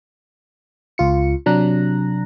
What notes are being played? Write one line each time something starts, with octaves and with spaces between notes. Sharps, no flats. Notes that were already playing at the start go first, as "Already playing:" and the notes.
C#2 F4 C#7
C3 F#3 D4 A#5 F#6 A#6